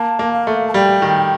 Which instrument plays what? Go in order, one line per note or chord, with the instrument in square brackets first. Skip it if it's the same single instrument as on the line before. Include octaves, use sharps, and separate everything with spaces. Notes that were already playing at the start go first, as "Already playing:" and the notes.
Already playing: [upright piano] A#3 [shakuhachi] A5
[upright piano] A#3
[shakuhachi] F5
[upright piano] A3
[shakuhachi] A5
[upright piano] G3 [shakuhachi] G5
[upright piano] D#3